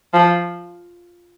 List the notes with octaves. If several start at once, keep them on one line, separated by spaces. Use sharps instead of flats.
F3